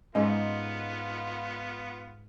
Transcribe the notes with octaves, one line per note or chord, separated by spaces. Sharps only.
G#2 G#3 B3 C#4 D#4 F4 D#5